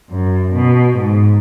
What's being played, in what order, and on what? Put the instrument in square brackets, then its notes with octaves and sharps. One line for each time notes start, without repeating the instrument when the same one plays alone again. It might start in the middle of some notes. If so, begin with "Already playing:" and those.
[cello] F#2
B2
G#2